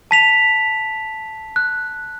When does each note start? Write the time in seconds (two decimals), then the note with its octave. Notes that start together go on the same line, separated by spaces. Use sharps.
0.11 A5 B6 F7
1.56 F#6